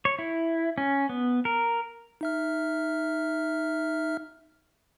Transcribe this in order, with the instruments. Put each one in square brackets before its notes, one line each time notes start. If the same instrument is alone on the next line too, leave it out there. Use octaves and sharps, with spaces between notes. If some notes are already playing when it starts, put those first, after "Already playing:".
[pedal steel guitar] C#5
E4
C#4
B3
A#4
[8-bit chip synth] D#4 E5 F6